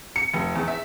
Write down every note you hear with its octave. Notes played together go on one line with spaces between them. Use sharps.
C#7
F1
E2
E5